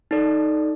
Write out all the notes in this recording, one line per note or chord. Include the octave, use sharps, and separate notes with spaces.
D#4 A4 D5